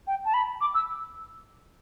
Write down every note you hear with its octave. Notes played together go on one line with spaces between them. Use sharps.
G5
A5
B5
D6
E6